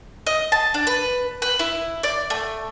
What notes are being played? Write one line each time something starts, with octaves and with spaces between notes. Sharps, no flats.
D#5
A5
D4
B4
B4
E4
D5
A3